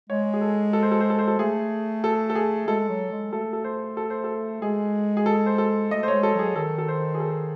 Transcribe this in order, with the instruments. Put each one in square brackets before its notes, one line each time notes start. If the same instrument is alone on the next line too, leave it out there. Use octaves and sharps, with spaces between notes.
[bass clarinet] G#3 [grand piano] C#5
[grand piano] G#4
A4
A4
C5
A4
C5
A4
C5
A4
[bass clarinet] A3 [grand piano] G#4
[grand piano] A4
A4
G#4
[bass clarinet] G#3 [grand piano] A4
[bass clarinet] F#3
G#3
[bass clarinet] A3 [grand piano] A4
[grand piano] A4
C5
A4
C5
A4
[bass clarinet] G#3 [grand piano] G#4
[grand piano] G#4
A4
C5
A4
[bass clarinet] A3 [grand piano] D#5
[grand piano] C5
[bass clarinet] G#3 [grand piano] C#5
[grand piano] A4
[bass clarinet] F#3 [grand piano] G#4
[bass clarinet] D#3 [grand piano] A4
[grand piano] A4
C5
G#4
A4